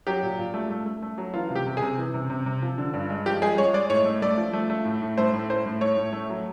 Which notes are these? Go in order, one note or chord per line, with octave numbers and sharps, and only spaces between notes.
F#3 G4
A#2
A#2
A3
A3
A3
A3
F#3
E3 F4
C3
G4
C3
G#4
C3
E3
C3
C3
C3
F3
D3
G2
G#3
F3 G4
G#3 G#4
G#3 C#5
G#3 D5
A2 C#5
A3
A3 D5
F3
A3
A3
A2
A2
A3 C5
A2
A2 C5
A2
A3 C#5
A2
A3
F#3